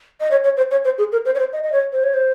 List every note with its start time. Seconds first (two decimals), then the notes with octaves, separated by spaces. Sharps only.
0.21 D#5
0.31 C#5
0.44 C#5
0.57 C5
0.71 C#5
0.85 C5
0.98 G#4
1.12 A#4
1.26 C5
1.35 C#5
1.39 C5
1.53 D#5
1.63 D#5
1.72 C#5
1.93 C5
2.04 C#5
2.14 C5